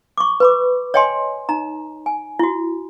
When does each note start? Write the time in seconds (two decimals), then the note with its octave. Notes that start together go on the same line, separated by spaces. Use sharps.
0.18 C#6 D6
0.40 B4 B5 D6
0.94 C#5 D#5 G5 G#5 C6
1.49 D#4 A#5
2.06 G#5
2.39 E4 F#4